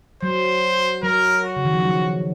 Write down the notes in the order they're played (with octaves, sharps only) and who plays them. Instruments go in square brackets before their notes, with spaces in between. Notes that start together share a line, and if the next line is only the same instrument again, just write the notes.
[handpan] F#3 [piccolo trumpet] C5
[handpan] F#3 [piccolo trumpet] A#4
[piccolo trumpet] F#4
[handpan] C#3
D#3
F3
F#3